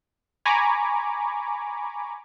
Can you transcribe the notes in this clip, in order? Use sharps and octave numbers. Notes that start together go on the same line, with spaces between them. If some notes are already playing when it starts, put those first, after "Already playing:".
G#5 A#5 B5 C#6 D6